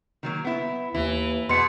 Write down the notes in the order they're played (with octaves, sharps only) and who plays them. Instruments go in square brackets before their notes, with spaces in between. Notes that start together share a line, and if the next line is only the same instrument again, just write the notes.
[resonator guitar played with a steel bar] D#3 F#3 A#3
B3 E4
[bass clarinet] D#2 [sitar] E3 [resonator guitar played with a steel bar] E4
[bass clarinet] E2 [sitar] B2 [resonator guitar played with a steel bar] G#3 [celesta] C6 C#7